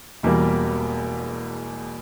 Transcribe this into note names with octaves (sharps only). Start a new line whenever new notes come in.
E1 E2 B2 G3 A#3